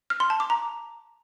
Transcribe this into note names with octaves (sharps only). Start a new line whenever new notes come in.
F6
C6
A5
D6
A#5